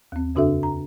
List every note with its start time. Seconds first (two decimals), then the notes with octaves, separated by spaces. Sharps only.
0.12 D#2 C4
0.35 F2 C#3 D4 F#4 A4 E5
0.63 A#5